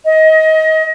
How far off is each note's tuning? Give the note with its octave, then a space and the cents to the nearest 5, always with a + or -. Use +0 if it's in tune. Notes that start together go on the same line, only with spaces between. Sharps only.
D#5 +25